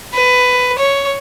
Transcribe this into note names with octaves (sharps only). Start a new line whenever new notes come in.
B4
C#5